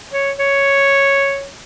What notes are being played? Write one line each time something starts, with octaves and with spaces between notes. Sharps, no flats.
C#5
C#5